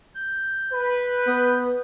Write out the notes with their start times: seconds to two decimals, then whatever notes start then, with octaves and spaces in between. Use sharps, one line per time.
0.15 G6
0.73 B4
1.27 B3